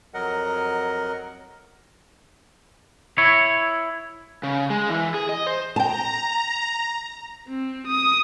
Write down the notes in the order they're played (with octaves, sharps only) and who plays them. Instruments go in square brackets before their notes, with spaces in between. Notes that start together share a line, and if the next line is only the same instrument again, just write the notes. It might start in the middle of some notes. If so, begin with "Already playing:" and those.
[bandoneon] F2 F#3 A#4 D#5 F#5
[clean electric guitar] E4 C#5
[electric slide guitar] C#3
G#3
E3
G#4
D#5
C5
[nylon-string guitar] G5 A5 [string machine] A#5
[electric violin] C4
D#6